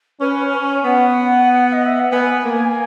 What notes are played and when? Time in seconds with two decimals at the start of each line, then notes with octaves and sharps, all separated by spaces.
0.20 C#4 B4
0.52 C#5
0.84 B3 F#5
1.72 D#5
1.85 E5
1.99 F#5
2.12 B3 G#5
2.45 A#3